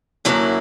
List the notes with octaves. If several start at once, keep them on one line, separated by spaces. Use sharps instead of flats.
F#2 D3 F#3 A#3 E4